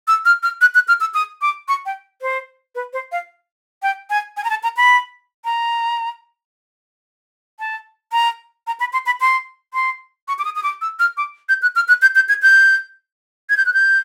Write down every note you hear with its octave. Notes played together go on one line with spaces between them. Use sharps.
E6
F6
F6
F#6
F#6
F6
E6
D#6
D6
C#6
G5
C5
B4
C5
F5
G5
G#5
G#5
A#5
A5
A#5
B5
A#5
A5
A#5
A#5
B5
C6
B5
C6
C6
C#6
D6
D#6
D#6
D6
E6
F6
D6
G6
F#6
F6
F#6
G6
G6
G#6
G6
G#6
G6
F#6
G6